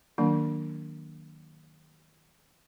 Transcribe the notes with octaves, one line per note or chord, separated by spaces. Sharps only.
D#3 F#3 A#3 D4